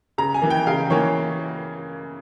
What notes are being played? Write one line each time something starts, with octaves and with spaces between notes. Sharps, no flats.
C#3 A#5
G#5
E3 A#3
G5
C#3 F5
E3 A#3 C#5